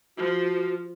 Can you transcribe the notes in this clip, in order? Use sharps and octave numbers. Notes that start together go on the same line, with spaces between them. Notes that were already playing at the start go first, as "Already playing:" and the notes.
F3 F#4